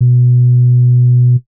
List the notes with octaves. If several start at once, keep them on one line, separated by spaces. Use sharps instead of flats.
B2